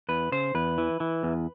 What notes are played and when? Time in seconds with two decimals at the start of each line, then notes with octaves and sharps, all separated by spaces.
0.09 E2 B4
0.32 C#3 C5
0.55 E2 B4
0.78 E3
1.00 E3
1.23 E2